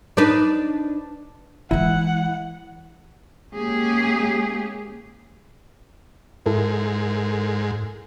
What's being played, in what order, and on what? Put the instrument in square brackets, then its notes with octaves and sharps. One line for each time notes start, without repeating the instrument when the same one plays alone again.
[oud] D4 D#4 B4
[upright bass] E3 G#3 [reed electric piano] E4 [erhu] F#5
[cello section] G#3 A#3 C#4 G4 G#4
[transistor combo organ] G#2 [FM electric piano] E4 A4 A#4